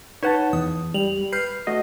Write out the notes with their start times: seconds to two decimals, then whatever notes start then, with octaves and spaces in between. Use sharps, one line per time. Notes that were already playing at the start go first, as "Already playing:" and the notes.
0.23 D#4 B4 C#5 F#5 A5 E7
0.53 E2 D#6
0.94 G3 F7 F#7
1.33 B4 F6 G6 C7
1.67 A3 F#4 D#5